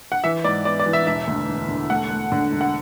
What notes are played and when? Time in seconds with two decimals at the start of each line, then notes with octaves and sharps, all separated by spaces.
0.12 F#5
0.24 E3 E5
0.44 G#2 D5
0.65 B3 D5
0.79 D5
0.86 E3
0.93 E5
1.07 E1 E5
1.27 D2
1.49 E1
1.69 D3
1.90 A3 F#5
2.11 A3
2.32 D3
2.52 E1
2.61 F#5